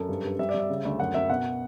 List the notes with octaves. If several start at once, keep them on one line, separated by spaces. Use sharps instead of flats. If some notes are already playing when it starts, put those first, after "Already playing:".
Already playing: F#2 A4
G2
G2
G3 E5
D5
G3
E5
C#3
D2
F#2 F#5
F#2 E5
B2 F#5